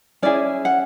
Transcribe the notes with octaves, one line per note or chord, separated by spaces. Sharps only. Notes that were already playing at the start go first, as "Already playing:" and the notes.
C#4 E4 G#4 D5
F#5